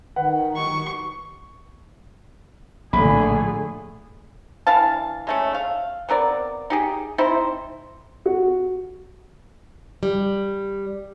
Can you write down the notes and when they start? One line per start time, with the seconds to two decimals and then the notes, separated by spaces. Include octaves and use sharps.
0.16 D#3 B4 F#5
0.56 C#6
2.93 A#1 A2 D3 A3 G#4 B5
4.67 E3 D4 F5 A5
5.27 G#3 A3 C#4
5.54 F5
6.09 B3 C4 A#4 D5
6.70 D#4 G4 G#4
7.18 C4 D#4 E4 C5
8.26 F#4
10.03 G3